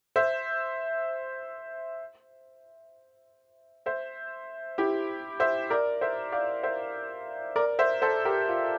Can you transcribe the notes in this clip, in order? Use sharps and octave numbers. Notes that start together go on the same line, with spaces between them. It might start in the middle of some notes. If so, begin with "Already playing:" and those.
C5 E5
C5 E5
E4 G4
C5 E5
A#4 D5
C5 E5
D5 F5
C5 E5
A#4 D5
C5 E5
A4 C5
G4 A#4
F4